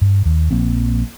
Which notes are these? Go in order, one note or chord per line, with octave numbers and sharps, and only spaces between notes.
G2
D#2
A#1 F3 A#3 C4